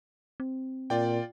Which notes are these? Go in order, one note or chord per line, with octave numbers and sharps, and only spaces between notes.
C4
A#2 F4 D5 G5